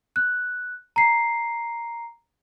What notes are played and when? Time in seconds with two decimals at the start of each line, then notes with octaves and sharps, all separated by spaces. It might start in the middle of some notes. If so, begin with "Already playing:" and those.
0.16 F#6
0.96 A#5 C7